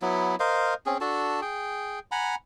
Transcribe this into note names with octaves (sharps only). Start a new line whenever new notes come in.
F#3 B3 E4
A#4 C5 D#5 F5
C4 C#4 G#4
D4 F#4 A4 A5
G#4 G5
F#5 G#5 A#5 B5